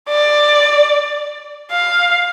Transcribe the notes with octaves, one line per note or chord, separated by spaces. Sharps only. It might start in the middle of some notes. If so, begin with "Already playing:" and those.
D5
F5